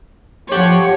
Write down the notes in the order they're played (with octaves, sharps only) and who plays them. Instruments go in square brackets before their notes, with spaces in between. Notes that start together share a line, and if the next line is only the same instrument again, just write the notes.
[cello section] F3 C#5 [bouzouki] G4 A4 F#5